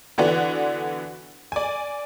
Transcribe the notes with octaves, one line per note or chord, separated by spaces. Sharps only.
D3 E3 B3 D4 F#4
D5 G#5